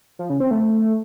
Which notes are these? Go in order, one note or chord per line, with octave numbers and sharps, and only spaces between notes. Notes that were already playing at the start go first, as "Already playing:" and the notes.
F3
C#3
C4
A3